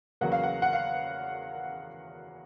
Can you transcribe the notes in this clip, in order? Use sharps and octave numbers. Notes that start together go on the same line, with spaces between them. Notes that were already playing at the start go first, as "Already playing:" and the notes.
E2 C#3 F#3 A#3 F#5
F5
F#5
F#5
F5